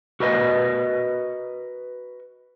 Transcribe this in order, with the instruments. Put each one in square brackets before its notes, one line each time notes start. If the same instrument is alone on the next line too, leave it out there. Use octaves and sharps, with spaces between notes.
[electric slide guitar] F#4 A#4 B4 D#5